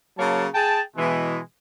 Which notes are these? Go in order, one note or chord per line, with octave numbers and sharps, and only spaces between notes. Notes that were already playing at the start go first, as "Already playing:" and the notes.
C#3 F#3 A#3 C#5 A5
G#4 G5 A5
B2 E3 G#3